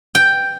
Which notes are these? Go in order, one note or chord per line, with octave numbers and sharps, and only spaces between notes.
G5